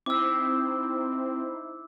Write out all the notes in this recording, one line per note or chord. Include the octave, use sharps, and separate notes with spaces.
C4 D#4 E4 C5 D6 E6